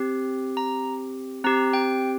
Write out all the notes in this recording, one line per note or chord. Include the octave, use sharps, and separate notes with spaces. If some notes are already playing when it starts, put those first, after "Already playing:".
Already playing: C4 G4
A#5
C4 G4 A#5
G5